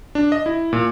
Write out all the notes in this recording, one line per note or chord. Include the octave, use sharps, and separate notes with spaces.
D4
D#5
E4
A#2